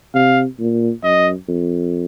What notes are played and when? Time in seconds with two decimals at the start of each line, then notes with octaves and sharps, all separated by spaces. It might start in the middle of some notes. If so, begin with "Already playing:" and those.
0.14 C3 F5
0.60 A#2
1.03 F#2 D#5
1.48 F2